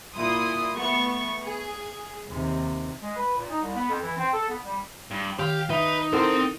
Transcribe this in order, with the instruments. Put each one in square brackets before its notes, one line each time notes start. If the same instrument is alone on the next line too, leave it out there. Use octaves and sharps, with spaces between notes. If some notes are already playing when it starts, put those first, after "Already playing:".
[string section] A#2 E4 C6 D#6
A3 B3 C#6
G#4
D#2 C3
[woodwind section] G#3
B4
A#2
D#4
C2
B3
F2
E3
C4
A4
B3
G3
[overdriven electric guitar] G2
[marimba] D#3 [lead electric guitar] G4 [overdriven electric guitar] F5
[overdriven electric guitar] D#4 [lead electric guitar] B4 [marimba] E5
[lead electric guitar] C4 C5 [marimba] E4 C6 [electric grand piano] A4 A#4 F#5